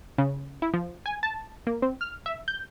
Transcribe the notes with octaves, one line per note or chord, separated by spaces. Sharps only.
C#3
E4
F3
G#5
A5
A#3
C4
F6
E5
G6